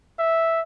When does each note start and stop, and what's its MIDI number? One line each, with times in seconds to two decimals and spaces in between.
0.19 0.61 76